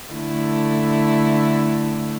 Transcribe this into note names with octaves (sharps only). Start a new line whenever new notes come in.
D3 A3 E4